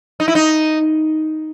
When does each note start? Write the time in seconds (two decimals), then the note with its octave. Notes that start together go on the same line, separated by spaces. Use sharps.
0.20 D#4
0.28 E4
0.35 D#4